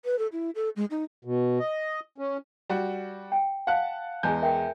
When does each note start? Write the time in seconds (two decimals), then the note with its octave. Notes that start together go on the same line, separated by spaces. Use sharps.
0.05 B4
0.19 A4
0.32 E4
0.55 A4
0.76 G#3
0.91 D#4
1.25 B2
1.60 D#5
2.18 C#4
2.70 G3 F#4
3.32 G5
3.67 F5 F#5 A5 F#6
4.23 E2 G#3 G#4 G#5 A5 G6
4.42 A#4 E5 G5